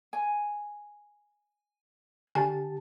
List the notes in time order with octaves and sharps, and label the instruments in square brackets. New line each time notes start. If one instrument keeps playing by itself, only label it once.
[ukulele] G#5
[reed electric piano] D3 G4 A5 [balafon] G#5